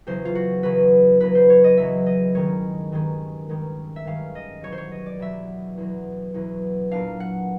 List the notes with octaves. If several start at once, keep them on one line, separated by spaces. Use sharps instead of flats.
E2 C#3 F#3 C5
F4
F#4
E2 C#3 F#3 B4
E2 C#3 F#3 B4
C5
C#5
D#5
E2 C#3 F#3 E5
D#5
G2 D#3 G#3 C#4 C#5
G2 D#3 G#3 C#4
G2 D#3 G#3 C#4
E5
G2 D#3 G#3 C#4 F5
D#5
E2 B2 F#3 C#5
C5
C#5
D#5
D5
E2 B2 F#3 E5
E2 B2 F#3
E2 B2 F#3
A#2 F#3 B3 D4 F5
F#5